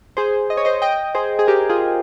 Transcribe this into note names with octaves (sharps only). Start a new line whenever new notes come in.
G#4 C5
D#5
C#5
C5 D#5
D#5 G5
G#4 C5
G#4
G4 A#4
F4 G#4